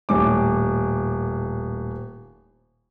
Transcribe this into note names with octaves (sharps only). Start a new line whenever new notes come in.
D#1 A2 D6